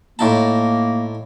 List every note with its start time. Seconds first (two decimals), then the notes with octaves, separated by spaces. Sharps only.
0.19 A2 A#3 D#4 A5